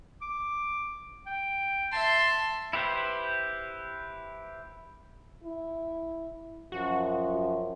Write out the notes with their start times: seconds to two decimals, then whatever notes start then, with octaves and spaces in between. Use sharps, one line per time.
0.22 D6
1.26 G5
1.92 E5 A5 C6
2.73 E4 G4 B4 C5
5.44 E4
6.72 F#2 F3 F#4